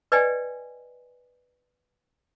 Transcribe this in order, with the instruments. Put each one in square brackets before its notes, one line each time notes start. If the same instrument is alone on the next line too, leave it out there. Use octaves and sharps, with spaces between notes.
[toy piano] B4 D5 D#5 G5 G#5